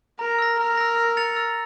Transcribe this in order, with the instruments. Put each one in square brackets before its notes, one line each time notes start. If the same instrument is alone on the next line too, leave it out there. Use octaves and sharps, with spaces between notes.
[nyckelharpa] A#4 [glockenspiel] A#5
[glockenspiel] E6 A#6
[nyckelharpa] A#4 [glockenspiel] A#5
[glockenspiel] E6 A#6
E6
A6 C#7 F7
E6